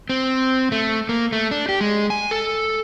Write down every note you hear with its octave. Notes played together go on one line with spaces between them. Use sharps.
C4
A3
A#3
A3
D4
G4
G#3
G#5
A4